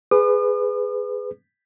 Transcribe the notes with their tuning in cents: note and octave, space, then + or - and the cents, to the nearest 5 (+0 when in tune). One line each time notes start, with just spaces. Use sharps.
G#4 +0 B4 +20 D#6 -45